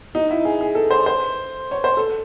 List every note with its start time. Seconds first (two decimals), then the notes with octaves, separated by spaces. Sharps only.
0.15 D#4
0.31 E4
0.45 G#4
0.61 G#4
0.75 A4
0.91 C5
1.06 C5
1.71 C#5
1.84 C5
1.97 A4